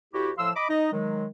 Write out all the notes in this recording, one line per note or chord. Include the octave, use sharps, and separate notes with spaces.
D2 E4 F#4 G4
A2 F3 F5 C6 E6
D#5 B5 D6
D#4 D#5
D#3 F#3 G#3